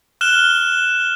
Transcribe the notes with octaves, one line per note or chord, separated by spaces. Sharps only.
F6 F#6 E7 G7